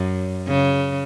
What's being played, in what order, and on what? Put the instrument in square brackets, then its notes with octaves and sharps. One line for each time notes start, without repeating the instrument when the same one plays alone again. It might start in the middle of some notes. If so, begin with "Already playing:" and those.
Already playing: [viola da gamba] F#2
C#3